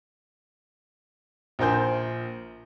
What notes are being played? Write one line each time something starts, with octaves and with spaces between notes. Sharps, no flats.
A#1 F3 A#4 C5 G#5 G6